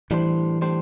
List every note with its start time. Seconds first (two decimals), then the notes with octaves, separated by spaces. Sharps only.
0.11 A2 E3 G3 D4 C5
0.61 A2 G3 D4 C5